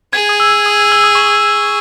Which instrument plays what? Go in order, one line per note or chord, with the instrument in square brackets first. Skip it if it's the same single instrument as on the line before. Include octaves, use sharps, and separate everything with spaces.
[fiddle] G#4 [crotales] G#6
[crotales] D#6
E6
D#6
E6
D#6
C#6
D#6